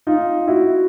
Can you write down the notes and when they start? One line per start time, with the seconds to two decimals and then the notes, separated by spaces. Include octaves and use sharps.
0.07 D#4 F4
0.47 E4 F#4